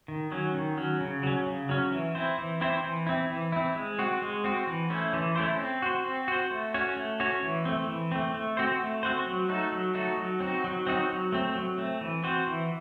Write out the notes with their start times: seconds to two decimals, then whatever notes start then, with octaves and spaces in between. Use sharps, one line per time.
0.08 D#3
0.32 F#3 C#4
0.54 D#3
0.77 F#3 C#4
1.01 C#3
1.23 F#3 C#4
1.46 C#3
1.69 F#3 C#4
1.92 E3
2.15 C4 E4 C5
2.38 E3
2.61 C4 E4 C5
2.84 E3
3.07 C4 E4
3.30 E3
3.52 C4 E4
3.75 G#3
3.99 C4 F#4
4.22 G#3
4.44 C4 F#4
4.67 E3
4.90 A3 C#4 E4 C5
5.13 E3
5.35 A3 C#4 E4 C5
5.59 C4
5.82 F#4 C5
6.05 C4
6.28 F#4 C5
6.51 A3
6.74 C#4 F#4 C#5
6.97 A3
7.20 C#4 F#4 C#5
7.43 E3
7.65 A3 C4
7.88 E3
8.12 A3 C4
8.34 A3
8.57 C4 F#4 C5
8.80 A3
9.03 C4 F#4 C5
9.27 F#3
9.49 A3 D#4 F#4 A4
9.72 F#3
9.95 A3 D#4 F#4 A4
10.17 F#3
10.40 C4 D#4 F#4
10.64 F#3
10.87 C4 D#4 F#4
11.09 F#3
11.32 A3 C4
11.55 F#3
11.78 A3 C4
12.01 E3
12.24 C4 F#4 C5
12.47 E3